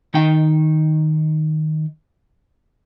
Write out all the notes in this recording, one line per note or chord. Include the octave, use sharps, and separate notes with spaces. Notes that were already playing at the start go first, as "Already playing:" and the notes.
D#3 D#4 G5